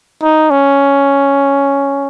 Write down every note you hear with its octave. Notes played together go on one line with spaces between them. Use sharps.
D#4
C#4